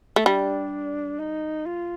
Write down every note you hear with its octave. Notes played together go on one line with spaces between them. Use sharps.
A3
G3 D4
D#4
F4